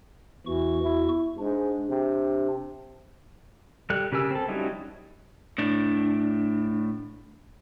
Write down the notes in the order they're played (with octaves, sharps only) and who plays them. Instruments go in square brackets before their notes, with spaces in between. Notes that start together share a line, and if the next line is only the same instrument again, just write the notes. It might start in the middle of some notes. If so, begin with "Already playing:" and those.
[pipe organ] E2 F#4 C#6 [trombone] E3
[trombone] E4
[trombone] G#2 [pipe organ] D4
[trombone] C3
[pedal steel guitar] G3 A4 F#6
C#3 G4 A#4 G#5 E6
C4 A4
F#3 G3 C#4 D#4 E4
[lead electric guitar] A2 D4